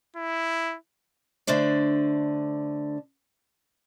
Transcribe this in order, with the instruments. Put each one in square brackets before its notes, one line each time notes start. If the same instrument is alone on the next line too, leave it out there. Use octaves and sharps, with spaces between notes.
[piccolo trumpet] E4
[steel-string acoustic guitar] D3 A3 D4 C5 D5